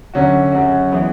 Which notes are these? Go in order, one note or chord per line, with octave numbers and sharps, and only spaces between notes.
F#2 D3 F#3 C#4 F#4
F#2 C#3 F#3 C#4 F#4
E3 G#3 B3 E4